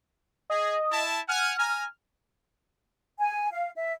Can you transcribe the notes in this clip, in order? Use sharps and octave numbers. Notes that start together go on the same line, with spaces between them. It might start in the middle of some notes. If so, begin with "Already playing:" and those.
G#4 D#5
E4 A5
F#5 G#5 F6
G#5 A#5
G#5
F5
E5